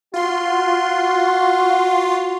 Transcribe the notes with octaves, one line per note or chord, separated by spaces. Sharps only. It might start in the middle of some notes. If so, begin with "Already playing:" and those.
F4 F#4 C6